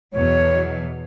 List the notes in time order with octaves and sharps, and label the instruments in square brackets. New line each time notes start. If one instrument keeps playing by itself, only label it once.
[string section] E2 B2 F#3 [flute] C#5